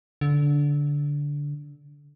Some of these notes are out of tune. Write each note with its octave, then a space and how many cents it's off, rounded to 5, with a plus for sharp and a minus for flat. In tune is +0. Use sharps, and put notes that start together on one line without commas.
D3 -15